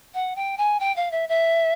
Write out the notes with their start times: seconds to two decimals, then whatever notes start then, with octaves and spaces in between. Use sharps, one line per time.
0.14 F#5
0.35 G5
0.57 G#5
0.79 G5
0.96 F5
1.11 E5
1.28 E5